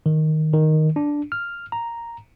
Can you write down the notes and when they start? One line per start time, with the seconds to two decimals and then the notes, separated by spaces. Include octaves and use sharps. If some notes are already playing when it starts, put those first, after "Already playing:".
0.06 D#3
0.53 D#3
0.96 D4
1.32 F6
1.72 A#5